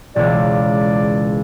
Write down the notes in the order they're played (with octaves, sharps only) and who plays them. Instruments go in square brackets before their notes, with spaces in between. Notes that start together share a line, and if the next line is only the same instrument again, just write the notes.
[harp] E1 C#2 [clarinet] D5